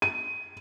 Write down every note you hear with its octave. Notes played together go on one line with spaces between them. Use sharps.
D#7